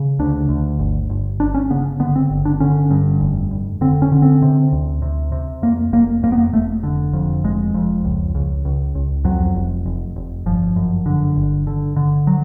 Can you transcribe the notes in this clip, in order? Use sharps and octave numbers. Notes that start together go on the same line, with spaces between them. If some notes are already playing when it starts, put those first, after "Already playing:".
Already playing: C#3
D2 D4
D2
G1
G1
G1 D4
C#4
C#3 B3
D3 B3
C4
G1
D4
D3 C#4
G2
F1
F1
D3 C4
C#4
D3
C4
C3
D2
C3
C3
F2 A#3
F1 A#3
F2 A#3
B3
A#3
F1 A3
D3
F2
F1 G#3
F2
C#2
C#2
C#2
C#2
F2 F#3
F1
F1
F1
G1 F3
F#2
D3
G1
D3
D3
F#3